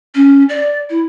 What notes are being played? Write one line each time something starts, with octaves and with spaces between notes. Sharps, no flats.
C#4
D5
E4